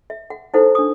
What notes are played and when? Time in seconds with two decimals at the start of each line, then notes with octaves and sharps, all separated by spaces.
0.10 E5
0.30 F#5
0.54 D#4 E4 A4 C5 F#5
0.75 D4 D#6